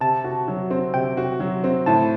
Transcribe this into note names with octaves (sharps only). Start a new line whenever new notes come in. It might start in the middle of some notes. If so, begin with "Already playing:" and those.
C3 A5
F#4
F#3
C4
C3 G5
F#4
F#3
C4
A2 A5